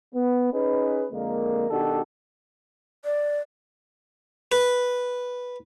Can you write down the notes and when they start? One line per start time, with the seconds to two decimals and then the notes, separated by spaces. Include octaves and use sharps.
0.14 B3
0.52 C#4 D#4 G#4 B4
1.11 F2 D3 G#3 A#3
1.70 B2 D#3 D4 F#4 G4 A4
3.05 D5
4.52 B4